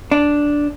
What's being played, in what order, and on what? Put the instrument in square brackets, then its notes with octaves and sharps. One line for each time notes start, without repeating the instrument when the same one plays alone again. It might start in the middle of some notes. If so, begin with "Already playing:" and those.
[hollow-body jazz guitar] D4